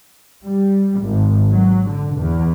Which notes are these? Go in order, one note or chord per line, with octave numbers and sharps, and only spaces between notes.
G3
G#1
F#3
D3
E2